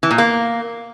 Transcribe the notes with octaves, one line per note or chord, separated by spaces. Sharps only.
E3
A#2
A#3